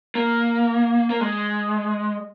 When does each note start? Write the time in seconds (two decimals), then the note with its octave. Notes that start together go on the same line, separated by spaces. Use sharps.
0.15 A#3
1.10 A#3
1.21 G#3